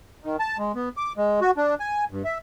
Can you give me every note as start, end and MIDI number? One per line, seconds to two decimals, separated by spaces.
0.24 0.36 51
0.40 0.57 81
0.58 0.72 56
0.75 0.89 59
0.97 1.13 86
1.17 1.40 56
1.41 1.51 66
1.57 1.75 62
1.80 2.05 80
2.11 2.23 43
2.25 2.38 76